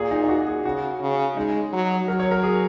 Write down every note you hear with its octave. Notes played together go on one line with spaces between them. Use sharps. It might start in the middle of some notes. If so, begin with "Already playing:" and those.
Already playing: A#2 G#4
D#4
D#4
F#4
G#4
C#3 F#4
C#3
G#3 D#4
F#3
F#3 A#4
C#5
A#4
G#4